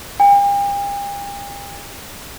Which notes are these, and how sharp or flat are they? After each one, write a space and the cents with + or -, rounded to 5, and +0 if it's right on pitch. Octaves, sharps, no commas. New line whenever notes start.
G5 +45